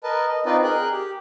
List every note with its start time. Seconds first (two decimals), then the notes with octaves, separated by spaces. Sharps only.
0.04 A#4 B4 D#5 A5
0.28 D#5
0.46 C4 D#4 F4 B4 D5 D#5
0.64 G#4 A#4 G5 F#6
0.92 G4